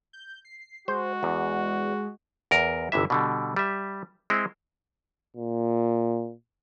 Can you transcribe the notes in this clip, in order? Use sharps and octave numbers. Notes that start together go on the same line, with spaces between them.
G6
C7
G#3 F#4 C5
E2
E2 A#4
G1 C3 E3 E5
B2 D3 G3
G3 E5
G#3 C4 E4
A#2